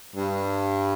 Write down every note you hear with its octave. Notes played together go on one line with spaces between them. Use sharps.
G2